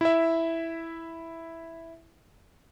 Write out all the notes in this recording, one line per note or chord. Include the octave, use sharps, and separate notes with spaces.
E4 E5